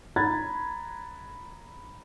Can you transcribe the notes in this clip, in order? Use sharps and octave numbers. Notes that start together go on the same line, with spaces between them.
A#5 B5 F#6 G#6 A6